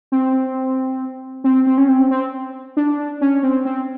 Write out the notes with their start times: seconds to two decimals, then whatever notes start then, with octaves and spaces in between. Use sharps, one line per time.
0.12 C4
1.44 C4
1.66 C4
1.78 C#4
1.89 C4
2.11 C4
2.77 D4
3.21 C#4
3.43 C4
3.65 C4